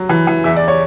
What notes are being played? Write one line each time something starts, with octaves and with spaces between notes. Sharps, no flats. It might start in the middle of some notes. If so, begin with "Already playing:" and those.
Already playing: F#3
E3
E3
E2 E5
D5
C#5